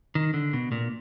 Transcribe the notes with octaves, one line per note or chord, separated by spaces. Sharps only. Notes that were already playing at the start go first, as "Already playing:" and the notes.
D#3
D3
B2
A#2